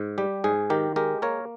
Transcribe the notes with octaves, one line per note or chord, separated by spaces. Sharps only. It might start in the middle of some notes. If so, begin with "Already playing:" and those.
Already playing: G#2
G3 G4
G#2 G#4
D#3 G4 A#4
G#3 G4 A#4
A#3 A#4 C#5